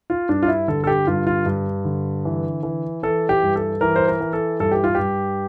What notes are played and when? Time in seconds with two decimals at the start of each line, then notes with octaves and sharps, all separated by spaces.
0.10 F4
0.29 G2 D4
0.42 F4
0.48 E4
0.68 D3 A4
0.84 A4
0.87 G4
1.07 G2 F4
1.27 F4
1.46 G2
1.85 D3
2.25 E3
2.63 E3
3.03 E3 A4
3.29 G4
3.43 G2
3.56 A4
3.81 E3 A#4
3.96 C5
4.08 A#4
4.20 E3
4.33 A4
4.60 G2 A4
4.71 G4
4.84 F4
4.95 G2 G4